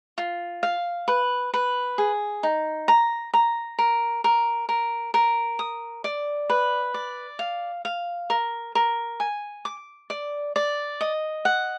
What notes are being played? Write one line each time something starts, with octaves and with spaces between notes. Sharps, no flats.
F4
F5
B4
B4
G#4
D#4
A#5
A#5
A#4
A#4
A#4
A#4
D#6
D5
B4
D5
F5
F5
A#4
A#4
G#5
D6
D5
D5
D#5
F#5